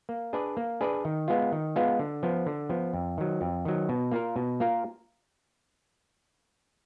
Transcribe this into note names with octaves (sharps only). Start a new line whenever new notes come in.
A#3
D4 G#4 B4 D5
A#3
D4 G#4 B4 D5
D#3
G#3 B3 F4
D#3
G#3 B3 F4
D3
F3 B3
D3
F3 B3
F2
D#3 F#3
F2
D#3 F#3
B2
A#3 F4 A#4
B2
A#3 F4 A#4